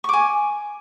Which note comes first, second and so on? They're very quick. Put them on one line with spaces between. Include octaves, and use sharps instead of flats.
C#6 D6 G#5